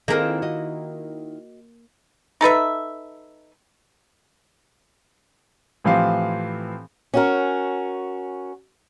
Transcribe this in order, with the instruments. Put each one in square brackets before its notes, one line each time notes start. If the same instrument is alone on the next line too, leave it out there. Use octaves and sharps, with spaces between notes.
[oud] D#3 E4 F4 [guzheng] A#3 A#4 [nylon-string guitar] C4 G#4 D#5
[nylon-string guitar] F#4 D#5
[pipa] D#4 A4 B4 E5
[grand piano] A2 E3 F3 C4 G4 F5
[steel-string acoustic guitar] C#4 F#4 A#4